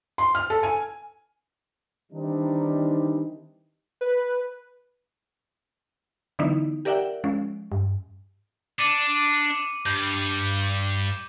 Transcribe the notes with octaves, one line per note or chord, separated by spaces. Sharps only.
C6
F6
A4
G#5
D#3 E3 G3 C4 D4 D#4
B4
D3 E3 F#3 B3 D#4 E4
G4 A#4 D5 E5 F#5 G5
F3 G#3 C#4
G2
D4 D6 C#7 D#7
G2 G6